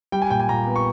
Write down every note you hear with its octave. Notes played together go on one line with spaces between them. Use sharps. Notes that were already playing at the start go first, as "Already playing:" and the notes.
G3 G5
G#5
A#2 G5
G#5
A#2 A#5
B3
C#6